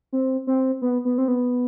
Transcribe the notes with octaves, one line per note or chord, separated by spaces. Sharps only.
C4
C4
B3
B3
C4
B3